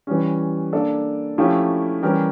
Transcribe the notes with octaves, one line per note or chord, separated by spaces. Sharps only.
E3 G3 C#4
A#3 D4 A4 D5
F3 A3 C#4 E4 G4
E3 G3 C#4 G4 A#4